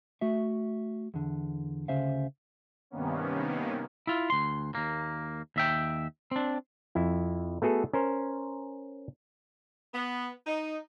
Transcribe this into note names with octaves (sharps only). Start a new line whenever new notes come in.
A3 F#4 E5
E2 D3
D2 C#3 C#4 C5 E5 F5
G2 C3 D#3 A#3 B3 C#4
E4 F4
D2 C6
D#2 A#3
D#2 E5 G5
C4 D4
F2 E4
A3 B3 F#4 G#4 A4
C#4 A#4 C5
B3
D#4